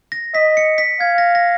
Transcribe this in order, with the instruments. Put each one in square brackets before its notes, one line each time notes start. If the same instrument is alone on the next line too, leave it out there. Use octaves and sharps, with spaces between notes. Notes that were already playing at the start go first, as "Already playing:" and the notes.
[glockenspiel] A#6
[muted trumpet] D#5 [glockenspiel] B6
[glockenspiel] C#7
B6
[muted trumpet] F5 [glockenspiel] G#6
[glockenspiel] A#6
A#6